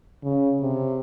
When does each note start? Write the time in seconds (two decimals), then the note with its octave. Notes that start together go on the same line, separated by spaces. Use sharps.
0.23 C#3
0.61 C3